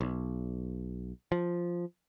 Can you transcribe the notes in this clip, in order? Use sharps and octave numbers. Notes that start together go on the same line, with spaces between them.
B1
F3